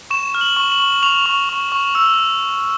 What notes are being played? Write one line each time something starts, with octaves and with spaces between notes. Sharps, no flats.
C#6 E7
F6
F#7
C#6
F#7
C#6
C#6 F7
C#6
C#6
C#6
E6